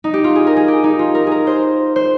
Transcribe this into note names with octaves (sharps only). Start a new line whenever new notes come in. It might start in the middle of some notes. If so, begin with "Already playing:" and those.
D#4
G4
F4
G#4
A#4
G#4
G4
D#4
F4
A#4
G#4 A#4
C5
C5